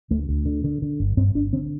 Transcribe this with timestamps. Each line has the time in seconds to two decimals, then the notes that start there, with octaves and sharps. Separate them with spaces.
0.11 D2 A3
0.29 D2
0.46 D3
0.64 D3
0.82 D3
1.00 G1
1.17 G2 C4
1.35 G1 D4
1.53 D3 C4